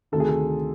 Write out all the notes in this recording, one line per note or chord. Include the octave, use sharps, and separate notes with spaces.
D2 C3 D#3 A4
G#4
A4